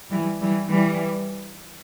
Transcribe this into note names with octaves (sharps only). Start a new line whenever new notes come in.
E3 G3
E3 G3
E3 G3